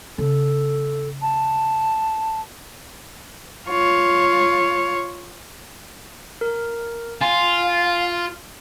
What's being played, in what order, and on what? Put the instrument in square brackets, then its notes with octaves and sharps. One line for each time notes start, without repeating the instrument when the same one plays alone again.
[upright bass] C#3 [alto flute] A4
[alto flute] A5
[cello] F4 C#5
[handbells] A#4
[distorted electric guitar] F4 [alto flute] F5 [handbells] G#5 C6